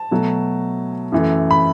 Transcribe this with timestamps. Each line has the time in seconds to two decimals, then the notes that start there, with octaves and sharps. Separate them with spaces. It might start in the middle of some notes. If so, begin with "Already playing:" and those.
Already playing: A5
0.11 B2 F#3 A3
1.12 F#2 E3 A3
1.51 B5